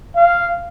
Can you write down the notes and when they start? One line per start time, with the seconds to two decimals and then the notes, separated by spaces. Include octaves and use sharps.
0.16 F5